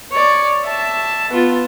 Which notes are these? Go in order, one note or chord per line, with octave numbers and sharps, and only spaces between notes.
C#5 D5
E5 A5
B3 F4